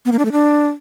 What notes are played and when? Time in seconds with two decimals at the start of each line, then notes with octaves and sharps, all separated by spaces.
0.05 B3
0.12 A#3
0.19 D4
0.25 A3
0.32 D4